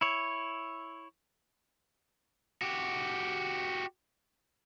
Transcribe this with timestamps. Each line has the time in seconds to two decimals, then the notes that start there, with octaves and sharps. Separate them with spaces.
0.01 E4 C#5
2.62 F#4 G4